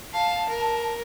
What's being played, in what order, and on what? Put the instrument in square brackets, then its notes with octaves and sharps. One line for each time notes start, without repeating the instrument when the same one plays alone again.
[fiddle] F5 [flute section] A5
[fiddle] A#4